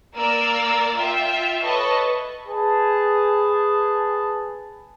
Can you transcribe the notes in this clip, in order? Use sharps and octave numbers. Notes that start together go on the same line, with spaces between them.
A#3 A#4 D5 E6
F4 E5 G5
A4 B4 C#5 D#5 A5 C#6
G#4 B4 A5